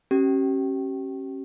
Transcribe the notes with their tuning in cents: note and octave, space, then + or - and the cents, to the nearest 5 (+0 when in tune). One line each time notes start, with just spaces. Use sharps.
C#4 -30 G4 -35